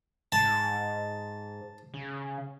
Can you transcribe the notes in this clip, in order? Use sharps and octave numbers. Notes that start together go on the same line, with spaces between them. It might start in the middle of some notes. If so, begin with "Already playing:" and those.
G#2 A5
C#3